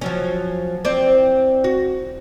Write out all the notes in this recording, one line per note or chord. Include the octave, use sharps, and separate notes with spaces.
F3 F#3 C#4
C4 D5
F#4